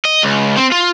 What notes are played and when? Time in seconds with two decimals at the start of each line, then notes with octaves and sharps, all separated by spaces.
0.05 D#5
0.24 C#2
0.58 C4
0.72 F4